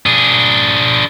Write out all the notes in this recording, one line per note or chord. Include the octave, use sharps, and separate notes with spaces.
D4 G#4